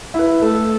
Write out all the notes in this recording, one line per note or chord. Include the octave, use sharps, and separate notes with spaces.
E4
B4
A3 A4